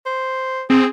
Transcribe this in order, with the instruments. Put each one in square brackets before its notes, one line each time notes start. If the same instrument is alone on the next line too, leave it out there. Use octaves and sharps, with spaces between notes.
[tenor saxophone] C5
[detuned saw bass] C4 [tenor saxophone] G#4